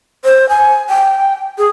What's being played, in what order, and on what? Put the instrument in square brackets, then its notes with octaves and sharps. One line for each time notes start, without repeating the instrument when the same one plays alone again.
[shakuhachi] C5
G#5
G5
G#4